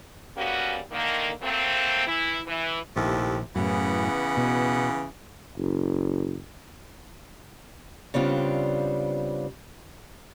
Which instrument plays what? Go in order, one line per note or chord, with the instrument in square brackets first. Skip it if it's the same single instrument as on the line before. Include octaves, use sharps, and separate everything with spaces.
[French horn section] C#3 G3 A#3 B3 C#4 F#4
D3 D#3 A#3
F#3 A3 A#3 C4
E3 E4
E3
[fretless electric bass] A#1 [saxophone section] D#2 A2 C3
[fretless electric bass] F#2 A2 [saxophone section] C#3 E3 B3
[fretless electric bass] B2
[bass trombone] F#1
[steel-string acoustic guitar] C#3 G3 B3 C4 D4 F4